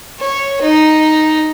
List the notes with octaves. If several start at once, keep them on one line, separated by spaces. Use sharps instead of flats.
C#5
D#4